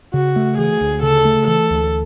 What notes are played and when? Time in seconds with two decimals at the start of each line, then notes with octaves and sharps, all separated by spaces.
0.14 C#3 F#4
0.36 A3
0.58 E3 G#4
0.81 D2
1.03 C#3 A4
1.25 A3
1.47 E3 A4
1.70 D2